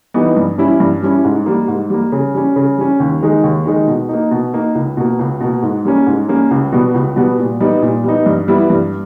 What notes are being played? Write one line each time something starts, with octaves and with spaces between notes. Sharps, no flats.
E3 G3 B3 D#4
G2
G3 C#4 E4
G2
G3 C#4 E4
G#2
G3 A#3
G#2
G3 A#3
C#3
G3 C#4
C#3
G3 C#4
D#2
D#3 G#3 D#4
D#2
D#3 G#3 D#4
B2
A#3 D#4
B2
A#3 D#4
C#2
B2 A#3
C#2
B2 A#3
G#2
G3 A#3 C#4
G#2
G3 A#3 C#4
C#2
B2 G3 B3
C#2
B2 G3 B3
A#2
G3 B3 D#4
A#2
G3 B3 D#4
G2
G3 B3 E4
G2